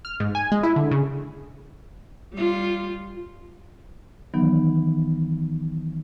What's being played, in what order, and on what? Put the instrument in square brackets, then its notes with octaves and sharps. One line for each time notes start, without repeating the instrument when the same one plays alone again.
[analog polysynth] F6
G#2
G#5
G#3
E4
D3
C#3
[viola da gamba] G3 F4
[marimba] D#3 E3 F#3 B3 D#4